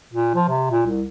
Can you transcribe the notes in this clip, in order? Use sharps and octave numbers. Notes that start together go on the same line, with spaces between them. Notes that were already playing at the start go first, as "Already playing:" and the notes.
A#2
F3
C3
A#2
C2